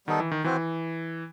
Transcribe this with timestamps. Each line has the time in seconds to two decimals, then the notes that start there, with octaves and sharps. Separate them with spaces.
0.07 D#3 G3 B3 D#4 A4
0.20 E3
0.31 D#3
0.44 E3 C4 F#4 C5